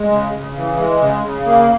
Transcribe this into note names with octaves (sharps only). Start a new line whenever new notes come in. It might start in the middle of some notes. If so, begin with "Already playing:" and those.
Already playing: G#3
C#3
C#3
E3
G#3
C#3
C#3
A#3